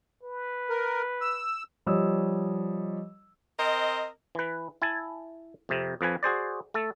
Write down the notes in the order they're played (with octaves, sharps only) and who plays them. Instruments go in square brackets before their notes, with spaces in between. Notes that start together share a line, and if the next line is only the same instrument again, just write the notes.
[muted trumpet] B4
[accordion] A#4
E6
[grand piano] F3 G3 C#5 D#5 D#6 E6
[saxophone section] C4 A#4 C5 D#5
[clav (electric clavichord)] E3 B4
E4 G#5 A5
F2 C3
F2 F3 B4 G#5
F#4 G#4 C5 D5
A3 A4